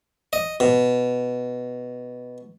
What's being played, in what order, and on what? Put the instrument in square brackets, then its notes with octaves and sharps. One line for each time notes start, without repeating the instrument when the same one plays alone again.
[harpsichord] D#5
B2